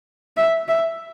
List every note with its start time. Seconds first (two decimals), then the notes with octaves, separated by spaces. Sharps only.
0.37 E5
0.68 E5